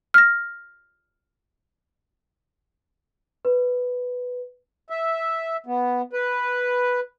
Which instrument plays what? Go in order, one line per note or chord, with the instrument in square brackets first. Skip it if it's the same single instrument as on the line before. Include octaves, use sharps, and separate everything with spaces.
[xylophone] F6 A#6
[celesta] B4
[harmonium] E5
B3
B4